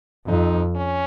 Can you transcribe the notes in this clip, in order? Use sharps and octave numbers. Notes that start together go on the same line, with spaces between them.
F2 D#4
C#4